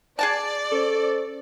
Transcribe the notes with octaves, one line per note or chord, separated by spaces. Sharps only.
G#4 D5 F#5 A5
C#4 A4 C5